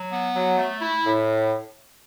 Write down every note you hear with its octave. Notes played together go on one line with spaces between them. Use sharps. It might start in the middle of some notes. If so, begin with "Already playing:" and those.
Already playing: F#3
B3
F#3
A3
E4
A2